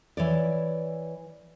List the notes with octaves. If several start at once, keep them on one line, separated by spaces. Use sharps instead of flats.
E3 C#5 D5